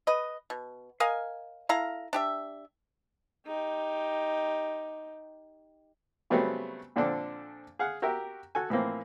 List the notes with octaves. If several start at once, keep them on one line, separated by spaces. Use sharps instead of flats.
B4 D#5
B2
A#4 D#5 F5 G#5
E4 A4 F5 A#5
D4 G4 E5
D#4 G4
C#3 F#3 G3 A3 B3 C4
A#2 D3 F3 C4 D4 A4
G#4 F5 F#5
F#4 G4 A#4 E5
F#4 A4 G#5
A2 E3 F3 A#3 C4